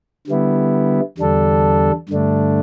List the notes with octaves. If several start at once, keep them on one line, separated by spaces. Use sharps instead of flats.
D3 G3 B3 E4
E2 D3 G3 D4 A4
G2 D3 A3 D4